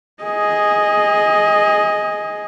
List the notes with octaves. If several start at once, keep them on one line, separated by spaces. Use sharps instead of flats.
G#4 D#5